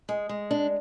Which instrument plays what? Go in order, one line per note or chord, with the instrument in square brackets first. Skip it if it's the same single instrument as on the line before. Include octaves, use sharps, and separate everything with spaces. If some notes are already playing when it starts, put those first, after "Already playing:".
[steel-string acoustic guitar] G#3
G#3
D4